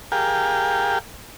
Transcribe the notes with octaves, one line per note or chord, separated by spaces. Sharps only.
G4 G#4 A#4 F5 G5